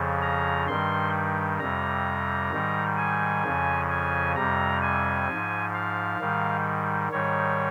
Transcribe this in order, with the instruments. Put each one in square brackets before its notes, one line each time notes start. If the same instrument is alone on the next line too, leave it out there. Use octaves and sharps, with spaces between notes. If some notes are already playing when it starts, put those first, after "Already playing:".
Already playing: [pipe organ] F2 C#3 F3
A#5
G2 D#3 G3 C6
F2 C3 G3 A#5
G#2 D#3 G3
G#5
F2 C#3 F3
G#5
F2 C3 G3 A#5
G#5
G#2 F3
F5
G#2 D#3 G3
G#2 D#3 G3 C#5